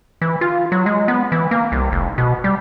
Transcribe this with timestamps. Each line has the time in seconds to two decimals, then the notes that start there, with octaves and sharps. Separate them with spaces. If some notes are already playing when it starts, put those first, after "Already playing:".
0.22 E3
0.41 F4
0.72 F#3
0.86 G#3
1.08 B3
1.32 E3
1.51 A#3
1.72 C2
1.92 F1
2.18 B2
2.44 G3